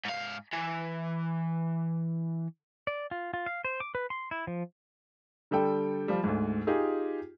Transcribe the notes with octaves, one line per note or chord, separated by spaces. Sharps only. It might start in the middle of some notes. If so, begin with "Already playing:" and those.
G#2 F5
E3
D5
F4
F4
F5
C5
D6
B4
C6
E4
F3
D3 G3 A4 G5
F3 G3
D2 G#2
D#4 F4 G4 G#4